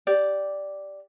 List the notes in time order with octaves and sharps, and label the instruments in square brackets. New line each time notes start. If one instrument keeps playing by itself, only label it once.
[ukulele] G4 D5